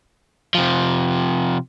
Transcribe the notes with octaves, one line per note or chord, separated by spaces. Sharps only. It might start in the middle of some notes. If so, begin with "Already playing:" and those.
C3 F3